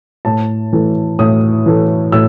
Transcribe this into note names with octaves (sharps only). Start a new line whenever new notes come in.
A2 A5
E3 A3
A2 D#6
E3 A3
A2 E6